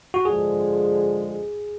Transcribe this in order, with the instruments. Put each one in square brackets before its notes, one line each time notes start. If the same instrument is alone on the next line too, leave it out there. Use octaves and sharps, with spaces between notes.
[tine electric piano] F#4
[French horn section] D3 F3 G#3 [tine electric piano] G#4